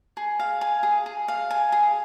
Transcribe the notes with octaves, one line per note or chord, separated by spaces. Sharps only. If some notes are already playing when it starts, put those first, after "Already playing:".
G#4
F5
G#5
G#4
G#4
F5
G#5
G#4